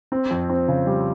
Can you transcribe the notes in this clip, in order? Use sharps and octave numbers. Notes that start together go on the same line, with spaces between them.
C4
F2
C4
C#3
G3